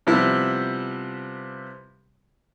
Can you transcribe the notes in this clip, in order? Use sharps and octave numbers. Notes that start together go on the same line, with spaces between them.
C3 F3 G3 B3 E4